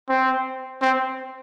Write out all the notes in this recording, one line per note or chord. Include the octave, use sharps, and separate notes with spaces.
C4
C4